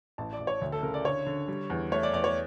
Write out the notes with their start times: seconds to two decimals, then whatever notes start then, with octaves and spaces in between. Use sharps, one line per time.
0.18 A1 A5
0.33 D5
0.40 A1
0.47 C#5
0.62 D2
0.72 A4
0.83 C#3 A#4
0.94 D5
1.05 D3 C#5
1.26 D3
1.48 G3
1.70 E2
1.92 A3 C#5
2.03 D5
2.13 E2 D5
2.24 C#5